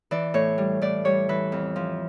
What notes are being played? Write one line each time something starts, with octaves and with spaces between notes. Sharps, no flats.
E3 D5
A2 C#5
G3
A2 D5
G3 C#5
E3 B4
F2
F3